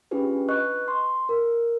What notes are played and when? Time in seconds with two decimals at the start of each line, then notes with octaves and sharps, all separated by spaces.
0.11 C#4 D4 F4 G4 G#4 B4
0.49 B4 D#5 C#6 F#6
0.88 C6
1.29 A#4